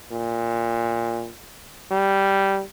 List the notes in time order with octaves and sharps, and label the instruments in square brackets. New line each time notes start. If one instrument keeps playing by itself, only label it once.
[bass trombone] A#2
G3